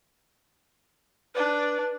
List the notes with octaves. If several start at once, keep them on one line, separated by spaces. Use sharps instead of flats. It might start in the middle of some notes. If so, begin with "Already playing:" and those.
D4 B4 D5